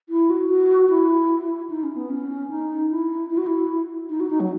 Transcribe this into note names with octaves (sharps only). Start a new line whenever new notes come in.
E4
F#4
F#4
E4
D#4
C#4
B3
C#4
D#4
E4
E4
F#4
E4
D#4
F#4
D#4
F#3